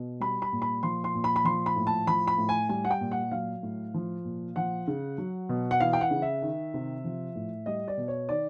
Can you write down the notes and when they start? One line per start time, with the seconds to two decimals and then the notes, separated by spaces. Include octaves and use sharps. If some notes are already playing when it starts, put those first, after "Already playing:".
Already playing: B2
0.20 G3 B5
0.42 B5
0.53 A#2
0.62 B5
0.83 F3 C6
1.04 C6
1.15 A#2
1.24 B5
1.36 B5
1.45 F3 C6
1.66 B5
1.76 A2
1.87 A5
2.07 F3 B5
2.27 B5
2.38 A2
2.49 G#5
2.69 G3 G#5
2.85 F#5
2.91 G5
3.01 A#2
3.11 F#5
3.31 F#3 F5
3.63 A2
3.94 F3
4.25 A#2
4.56 F3 F#5
4.88 C#3
5.18 F#3
5.49 B2
5.71 F#5
5.80 E3 F5
5.93 G5
6.01 F#5
6.11 C#3
6.22 E5
6.42 D#3
6.74 C3
7.04 F3
7.35 A2
7.66 G3 D#5
7.88 D5
7.97 B2
8.08 C#5
8.29 D#3 D5